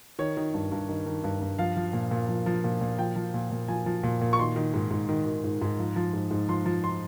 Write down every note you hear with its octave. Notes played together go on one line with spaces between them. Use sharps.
D#3 C#5
D#3
G2
G2
D#3
D#3
G2
G2
F3 F5
F3
A#2
A#2
F3
F3
A#2
A#2
F3 G5
F3
A#2
A#2
F3 G#5
F3
A#2
A#2
C#6
D#3 C6
D#3
G#2
G#2
D#3
D#3
G#2
G#2
F3
F3
G#2
G#2
F3 C6
F3
C6